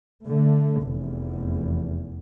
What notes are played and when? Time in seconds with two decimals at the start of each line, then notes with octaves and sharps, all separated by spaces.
0.25 D3 A3
0.82 F1 E2